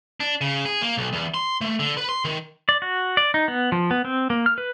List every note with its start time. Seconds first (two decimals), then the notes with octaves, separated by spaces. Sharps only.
0.20 D4
0.41 C#3
0.65 G#4
0.82 A#3
0.97 B1
1.13 E2
1.34 C6
1.61 A3
1.79 D3
1.97 B4
2.09 C6
2.25 D#3
2.69 D5
2.82 F#4
3.17 D5
3.34 D#4
3.48 B3
3.72 F3
3.91 B3
4.05 C4
4.30 A#3
4.46 F6
4.58 B4